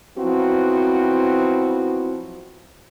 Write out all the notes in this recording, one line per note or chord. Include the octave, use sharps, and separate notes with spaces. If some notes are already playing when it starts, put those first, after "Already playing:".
F3 F#3 B3 C4 E4 F#4